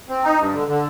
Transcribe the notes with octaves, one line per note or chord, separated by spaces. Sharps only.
C4
D#4
G2
D3
D3